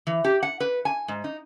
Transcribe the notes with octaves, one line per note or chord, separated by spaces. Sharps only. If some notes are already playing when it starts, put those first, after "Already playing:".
E3
G4
F#5
B4
G#5
G#2
D#4